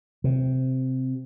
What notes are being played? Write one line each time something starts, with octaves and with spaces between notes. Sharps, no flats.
C3